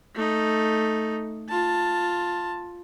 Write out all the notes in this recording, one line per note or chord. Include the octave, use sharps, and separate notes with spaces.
A3 D#4
F4 A5